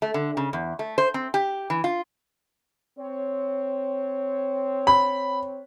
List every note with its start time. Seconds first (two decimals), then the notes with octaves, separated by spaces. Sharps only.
0.02 A3
0.14 D3
0.37 C#3
0.53 E2
0.79 A3
0.98 C5
1.14 C4
1.34 G4
1.70 E3
1.84 F4
2.99 C4 C#5
4.87 B5